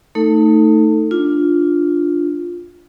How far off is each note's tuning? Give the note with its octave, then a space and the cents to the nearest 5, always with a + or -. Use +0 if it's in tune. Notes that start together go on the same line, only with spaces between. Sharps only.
A3 +25 D#4 +5 A4 +20
D4 +0 F4 +0